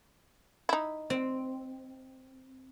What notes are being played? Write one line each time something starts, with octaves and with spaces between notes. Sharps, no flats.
D#4 E4
C4